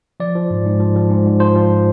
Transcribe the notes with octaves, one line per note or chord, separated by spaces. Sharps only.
F3 D5
F3
G#2
G#2
F3
F3
G#2
G#2
F3 C5
F3